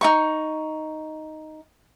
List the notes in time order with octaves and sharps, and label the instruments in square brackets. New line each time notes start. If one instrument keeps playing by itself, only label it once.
[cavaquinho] D#4 E4 C#6